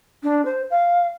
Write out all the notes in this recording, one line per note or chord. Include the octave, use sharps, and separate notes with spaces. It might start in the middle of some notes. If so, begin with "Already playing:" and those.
D4
C5
F5